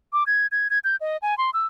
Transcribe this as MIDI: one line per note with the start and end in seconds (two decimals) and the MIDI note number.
0.13 0.24 86
0.27 0.47 92
0.52 0.68 92
0.70 0.79 92
0.84 0.96 91
1.01 1.17 75
1.22 1.37 80
1.38 1.50 84
1.54 1.67 88